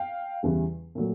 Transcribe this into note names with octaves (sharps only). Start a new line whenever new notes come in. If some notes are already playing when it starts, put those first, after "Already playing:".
Already playing: F5 G5
E2 C#3 E3 G3
A#2 F#3 A3